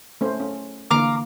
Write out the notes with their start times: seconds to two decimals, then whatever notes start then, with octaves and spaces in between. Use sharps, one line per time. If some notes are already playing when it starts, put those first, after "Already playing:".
0.21 A3 C#4 C5
0.40 C#4
0.91 D3 E3 A#3 F5 A#5 D6